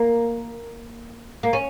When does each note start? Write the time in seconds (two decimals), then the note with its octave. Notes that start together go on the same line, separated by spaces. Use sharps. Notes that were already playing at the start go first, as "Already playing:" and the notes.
Already playing: A#3
1.43 A#3
1.53 C#4